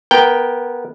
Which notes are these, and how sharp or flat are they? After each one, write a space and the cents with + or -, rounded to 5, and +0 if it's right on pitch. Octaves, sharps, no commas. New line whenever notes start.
B3 -15 A#4 +0 G5 +0